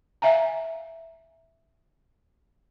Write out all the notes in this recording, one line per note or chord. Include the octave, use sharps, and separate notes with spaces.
E5 F5 G#5 A#5